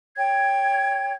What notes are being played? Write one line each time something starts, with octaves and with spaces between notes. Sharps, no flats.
C#5 G5 G#6